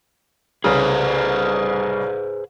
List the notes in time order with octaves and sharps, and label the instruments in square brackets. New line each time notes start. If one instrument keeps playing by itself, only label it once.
[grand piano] C2 C#3 [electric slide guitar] G#4 B4 C5